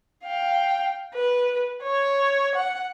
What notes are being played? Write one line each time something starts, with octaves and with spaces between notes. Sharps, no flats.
F5 G5
B4
C#5
F#5